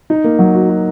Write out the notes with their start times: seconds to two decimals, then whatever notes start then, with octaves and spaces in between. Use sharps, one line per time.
0.10 D#4
0.24 A#3
0.39 F#3
0.55 F#4
0.69 F#4